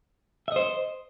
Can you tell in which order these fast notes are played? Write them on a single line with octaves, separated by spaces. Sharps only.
E5 D#5 C5